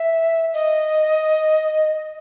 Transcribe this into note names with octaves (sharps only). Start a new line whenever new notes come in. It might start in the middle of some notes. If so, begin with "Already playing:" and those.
Already playing: E5
D#5